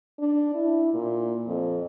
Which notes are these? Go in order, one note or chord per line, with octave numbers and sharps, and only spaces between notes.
D4
E4
A#2
F2